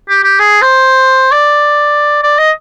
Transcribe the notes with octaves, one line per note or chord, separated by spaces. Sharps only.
G4
G4
G#4
C5
D5
D5
D#5